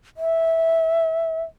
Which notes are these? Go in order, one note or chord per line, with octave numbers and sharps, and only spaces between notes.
E5